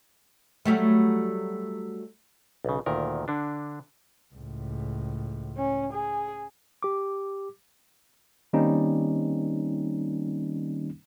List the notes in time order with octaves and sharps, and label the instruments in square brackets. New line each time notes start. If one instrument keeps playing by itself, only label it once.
[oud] F#3 G3 A3
[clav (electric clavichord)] B1 C#3
D2 A#2 D#3 A#4
D3 D4
[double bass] C#2 A2
[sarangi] C#4
G#4
[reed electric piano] G4 D6
[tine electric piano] D#3 G3 A#3 C4 C#4 D#4